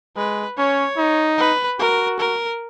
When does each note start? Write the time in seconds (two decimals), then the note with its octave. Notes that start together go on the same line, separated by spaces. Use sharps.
0.16 G#3 B4
0.58 C#4 C#5
0.98 D#4
1.38 B4
1.79 F#4 A#4
2.20 A#4